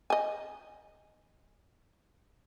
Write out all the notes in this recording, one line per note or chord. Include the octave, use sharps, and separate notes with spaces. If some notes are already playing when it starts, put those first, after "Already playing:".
D#5 G#5